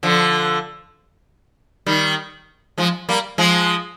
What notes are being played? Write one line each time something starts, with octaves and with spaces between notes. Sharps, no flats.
D3 F3
D#3 G3
F3 G#3
G3 A#3
F3 G#3